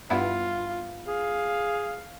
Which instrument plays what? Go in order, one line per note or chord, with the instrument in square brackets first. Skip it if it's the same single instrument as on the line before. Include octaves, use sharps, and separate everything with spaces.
[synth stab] G2 B3 E4 [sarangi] F4
[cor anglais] G#4 [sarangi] F5